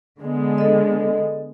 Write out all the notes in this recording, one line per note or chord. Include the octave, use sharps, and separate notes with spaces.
D3 G#3 B3
A4 D#5